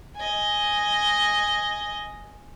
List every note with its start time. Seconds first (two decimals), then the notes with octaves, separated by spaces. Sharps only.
0.16 D#5 G#5